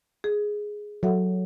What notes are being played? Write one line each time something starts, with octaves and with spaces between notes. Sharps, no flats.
G#4
F#3 A4 E5 F#5